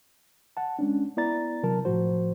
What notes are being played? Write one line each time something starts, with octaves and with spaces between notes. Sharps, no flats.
F#5 A5
G#3 C#4 D4
B3 E4 D5 A#5 A6
C3 F#3 A#4 A5
A2 F3 F#4 C5